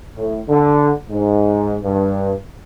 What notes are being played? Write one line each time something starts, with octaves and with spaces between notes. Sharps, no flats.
A2
D3
G#2
G2